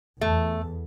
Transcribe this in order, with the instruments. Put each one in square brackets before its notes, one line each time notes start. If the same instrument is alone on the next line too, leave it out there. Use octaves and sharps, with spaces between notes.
[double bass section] E2 [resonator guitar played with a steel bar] A3